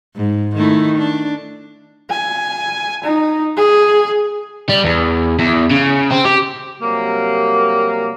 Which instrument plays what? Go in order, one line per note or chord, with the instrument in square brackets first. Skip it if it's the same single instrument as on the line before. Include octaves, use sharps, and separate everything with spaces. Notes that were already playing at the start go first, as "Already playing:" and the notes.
[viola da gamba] G#2
D#3 A3 E4
D4
[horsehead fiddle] G#5
D#4
G#4
[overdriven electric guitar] G3
E2
E2
C#3
C4
G4
[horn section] C3 F#3 G3 A#3